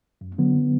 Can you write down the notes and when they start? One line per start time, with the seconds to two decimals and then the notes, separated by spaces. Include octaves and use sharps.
0.21 F#2
0.38 D3 F#3 B3